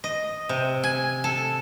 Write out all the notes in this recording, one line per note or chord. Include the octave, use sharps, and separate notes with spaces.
D#5
C3
G#5
A4